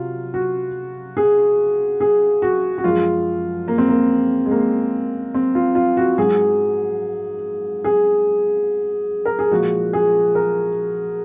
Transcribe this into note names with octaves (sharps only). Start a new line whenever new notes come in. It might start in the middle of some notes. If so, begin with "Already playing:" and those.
Already playing: C3 F#3 F4
F#4
G#4
G#4
F#4
F#4
F#2 F3 G#3 F4
A#3
C4
A#3
G#3
A#3
C4
F4
F4
F#4
G#2 F#3 G#4
G#4
A#4
G#4
A#2 F3 G#3 F#4
G#4
A#4